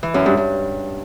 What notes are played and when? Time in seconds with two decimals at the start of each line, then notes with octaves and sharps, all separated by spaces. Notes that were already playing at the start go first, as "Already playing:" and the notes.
0.03 E3
0.14 F#2
0.26 G2
0.37 G2